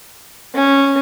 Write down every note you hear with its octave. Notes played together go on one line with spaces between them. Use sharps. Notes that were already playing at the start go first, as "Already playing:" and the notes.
C#4